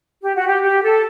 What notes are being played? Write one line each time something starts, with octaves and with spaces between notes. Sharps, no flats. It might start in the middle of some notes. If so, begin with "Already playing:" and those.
G4
F#4
G4
G4
A4